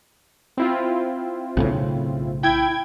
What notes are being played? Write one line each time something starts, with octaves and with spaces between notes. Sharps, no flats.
C4 E4 F4
B1 A2 C#3
E4 G5 G#6